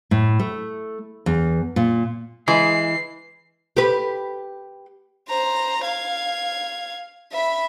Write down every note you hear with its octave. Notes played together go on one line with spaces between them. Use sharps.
A2
A3
E2
A#2
E3 G#3 C7
G4 B4
C5 A#5
F5 G#6
E5 B5